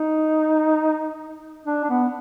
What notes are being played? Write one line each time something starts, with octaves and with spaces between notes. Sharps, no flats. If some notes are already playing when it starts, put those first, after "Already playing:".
Already playing: D#4
D4
D4
B3